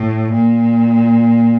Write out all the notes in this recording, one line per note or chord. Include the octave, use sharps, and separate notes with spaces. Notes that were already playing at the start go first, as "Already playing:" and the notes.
Already playing: A2
A#2